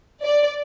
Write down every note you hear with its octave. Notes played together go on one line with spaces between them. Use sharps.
D5